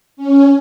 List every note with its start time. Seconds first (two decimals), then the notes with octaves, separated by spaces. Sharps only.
0.17 C#4